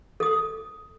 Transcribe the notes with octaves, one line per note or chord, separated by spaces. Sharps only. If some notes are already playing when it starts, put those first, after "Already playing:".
A4 D#6